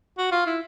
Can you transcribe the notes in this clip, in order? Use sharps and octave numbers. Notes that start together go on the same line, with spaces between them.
F#4
F4
E4